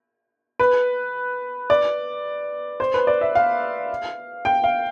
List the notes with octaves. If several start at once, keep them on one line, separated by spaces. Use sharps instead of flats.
B4
D5
C5
B4
D5
E5
F5
G5
F5